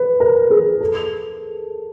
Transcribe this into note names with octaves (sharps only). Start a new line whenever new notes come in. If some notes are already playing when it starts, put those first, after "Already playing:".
Already playing: B4
A#4
G#4
A4